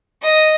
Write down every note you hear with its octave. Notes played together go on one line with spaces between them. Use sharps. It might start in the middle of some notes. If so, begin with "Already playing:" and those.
D#5